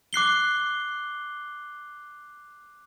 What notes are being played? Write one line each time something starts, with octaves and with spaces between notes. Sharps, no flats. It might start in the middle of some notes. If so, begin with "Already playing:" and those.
D6 F#6 C7 G7